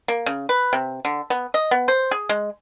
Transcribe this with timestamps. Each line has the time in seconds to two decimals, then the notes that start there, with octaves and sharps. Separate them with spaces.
0.08 A#3
0.26 C#3
0.49 B4
0.73 C3
1.05 D3
1.30 B3
1.54 D#5
1.71 B3
1.88 C5
2.11 G#4
2.29 G#3